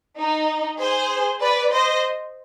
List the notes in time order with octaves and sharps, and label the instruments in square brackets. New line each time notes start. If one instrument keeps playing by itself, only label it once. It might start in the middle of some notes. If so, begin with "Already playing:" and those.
[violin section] D#4
G#4 C5
B4 D5
C5 D#5